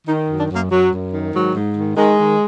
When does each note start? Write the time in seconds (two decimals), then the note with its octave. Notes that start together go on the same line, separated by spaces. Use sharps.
0.07 D#3 D#4
0.29 F#2
0.39 D4
0.50 F#2
0.56 A#3
0.71 F#2 F#3
0.92 F#2
1.14 D#3
1.34 G#2 F#3
1.55 G#2
1.76 D#3
1.97 D#3 G#3
2.19 D#3